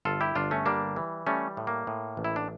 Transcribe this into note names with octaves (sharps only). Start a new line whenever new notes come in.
G1 F4 A4
E4 G4
G1 D4 F4
A3 C#4
G3 A#3 D4
E3
G3 A3 C#4
A2
A#3
A2
A1
E4
D4